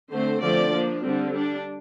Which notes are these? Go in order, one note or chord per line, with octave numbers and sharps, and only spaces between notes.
D3 A3 C4 C5
D3 F3 A3 C4 D5
F3 A#3 D4
D3 G3 C4
G3 D4